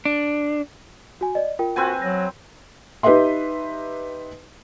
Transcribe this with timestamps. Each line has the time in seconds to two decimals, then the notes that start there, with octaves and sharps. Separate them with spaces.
0.05 D4
1.21 F#4 G#5
1.35 D5 D#5
1.59 F4 A#4 G5
1.76 C4 F#4 B4 G#5
2.02 F#3 A#6
3.03 D#4 G4 B4 D#5 E5 C6